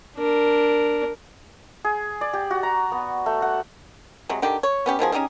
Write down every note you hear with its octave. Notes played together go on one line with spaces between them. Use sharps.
D4 A#4
G#4
D5
G4
F#4
A#5
B3
A3
F#5
C3 F#3 G#3
D3 D#3 G4
C#5
B3 C#4 G4
B2 D#3 F3 G#4
C#4 D#4 G4 G#4